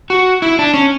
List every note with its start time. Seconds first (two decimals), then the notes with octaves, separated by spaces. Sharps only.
0.10 F#4
0.42 E4
0.59 D4
0.74 C#4